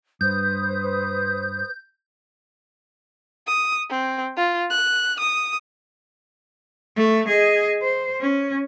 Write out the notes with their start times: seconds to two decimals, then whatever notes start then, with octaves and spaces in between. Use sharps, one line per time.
0.21 G2 B4 C5 D#6 G6
3.47 D#6
3.90 C4
4.37 F4
4.71 F#6
5.20 D#6
6.97 A3
7.28 G#4 D#5
7.82 C5
8.20 C#4